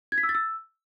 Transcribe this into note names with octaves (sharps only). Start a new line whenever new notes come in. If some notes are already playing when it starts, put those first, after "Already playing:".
G#6
B6
E6
A6
E6